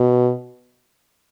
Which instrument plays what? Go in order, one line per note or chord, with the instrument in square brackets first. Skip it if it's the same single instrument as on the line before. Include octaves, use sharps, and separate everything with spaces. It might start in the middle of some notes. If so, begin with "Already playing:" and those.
Already playing: [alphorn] B2